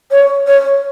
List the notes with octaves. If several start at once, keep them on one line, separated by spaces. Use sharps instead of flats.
C#5
C#5